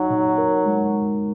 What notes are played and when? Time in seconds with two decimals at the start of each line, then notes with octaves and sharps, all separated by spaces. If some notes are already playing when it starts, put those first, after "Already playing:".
Already playing: F#3 D#4
0.10 A#2
0.38 A#4
0.66 G#3